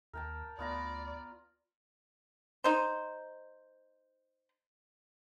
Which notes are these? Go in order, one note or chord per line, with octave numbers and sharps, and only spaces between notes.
D#2 A#4 G5 A5
D2 B3 F4 D5 A#5
D#4 C5